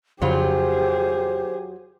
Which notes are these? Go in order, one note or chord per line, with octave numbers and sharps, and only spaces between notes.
F2 C#3 F#3 F4 G4 G#4 C5